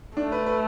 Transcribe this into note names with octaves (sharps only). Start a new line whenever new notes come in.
A3 D4
B4
B4